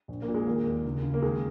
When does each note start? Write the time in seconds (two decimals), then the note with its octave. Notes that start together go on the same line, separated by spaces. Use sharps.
0.08 A#1
0.22 A#3
0.28 A#2
0.34 G#3
0.47 D#3 A#3
0.65 D#2
0.85 C#2
1.03 C#3
1.14 A#3
1.22 D#3 G#3